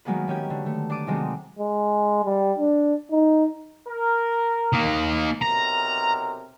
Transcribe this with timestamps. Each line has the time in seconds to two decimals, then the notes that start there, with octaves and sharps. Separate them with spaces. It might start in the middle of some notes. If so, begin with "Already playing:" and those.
0.05 D#3 F#3 G#3 A#3 B3 B4
0.28 D#3 C#4 G4 G#6
0.50 D3
0.66 A3
0.90 D4 A5 D6 D#6
1.07 C3 D#3 F#3 G#3 A3 C4
1.59 G#3
2.25 G3
2.58 D4
3.11 D#4
3.89 A#4
4.73 D#3 A#3
5.42 B1 C3 A#4 A#5